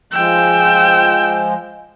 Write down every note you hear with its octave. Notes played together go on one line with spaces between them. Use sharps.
F3 G#3 G5 E6